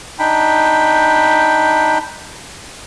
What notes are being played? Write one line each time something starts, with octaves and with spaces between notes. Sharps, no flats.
D4 D#4 G5 B5